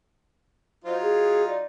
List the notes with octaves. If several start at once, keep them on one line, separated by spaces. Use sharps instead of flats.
F#3 D#4 F4 C5
G#4
D5